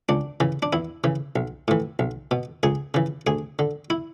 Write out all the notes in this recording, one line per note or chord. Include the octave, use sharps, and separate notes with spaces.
C#2 D4
C#3 E3
D4
E2 E4
C#3 E3
B1
A2 E3
B1
B2
C#2 G#4
C#3 E3
D2 G#4
D3
E4